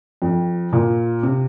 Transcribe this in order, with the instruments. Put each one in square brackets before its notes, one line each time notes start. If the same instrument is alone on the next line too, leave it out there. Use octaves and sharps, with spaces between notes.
[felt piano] F2
A#2
C3